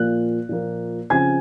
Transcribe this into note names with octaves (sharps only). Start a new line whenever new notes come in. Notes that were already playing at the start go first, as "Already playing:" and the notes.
Already playing: A#2 F3 A#3 F#6
A#2 F3 A#3
C#3 F3 C4 G#5 G#6